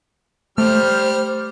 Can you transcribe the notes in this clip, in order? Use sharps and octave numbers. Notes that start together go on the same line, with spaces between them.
G3 A3 G4 C5 F6